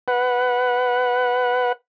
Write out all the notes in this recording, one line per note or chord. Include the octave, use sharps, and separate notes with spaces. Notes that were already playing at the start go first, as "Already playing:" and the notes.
B4 F#5